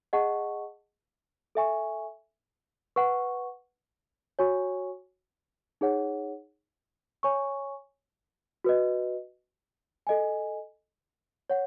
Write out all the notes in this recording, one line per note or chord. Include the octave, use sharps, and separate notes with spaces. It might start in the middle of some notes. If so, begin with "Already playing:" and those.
G#4 D#5 F#5 A5 C#6
A4 E5 G#5 C#6
B4 F#5 C#6
F#4 C#5 G#5 C#6
D#4 G#4 C#5 F#5
C#5 G#5 C#6
F#4 B4 D#5
A4 D#5 G#5
C#5 F#5